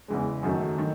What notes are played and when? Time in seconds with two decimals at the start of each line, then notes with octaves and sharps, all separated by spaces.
0.08 E2 C#3 E3 G#3
0.43 F#2 D#3 F#3 A3
0.78 D#3